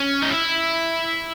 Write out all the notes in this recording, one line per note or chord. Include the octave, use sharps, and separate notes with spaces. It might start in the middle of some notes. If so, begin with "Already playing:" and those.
Already playing: C#4
D#4
E4